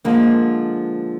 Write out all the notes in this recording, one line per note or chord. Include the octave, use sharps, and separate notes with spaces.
D3 F3 G#3 A#3